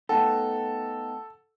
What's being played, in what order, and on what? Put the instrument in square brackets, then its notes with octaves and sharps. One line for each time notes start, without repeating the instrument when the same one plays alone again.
[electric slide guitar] A3 B3 D#4 [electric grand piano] A4 [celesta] F#5 G5 A5